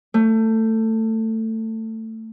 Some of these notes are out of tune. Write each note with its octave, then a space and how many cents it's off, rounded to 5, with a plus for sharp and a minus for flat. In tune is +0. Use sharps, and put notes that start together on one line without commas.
A3 +20